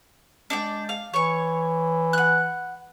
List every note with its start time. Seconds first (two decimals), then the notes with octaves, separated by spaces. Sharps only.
0.50 G#3 D4 D5 G5
0.89 F5
1.14 E3 C#5 C#6
2.13 F#5 F#6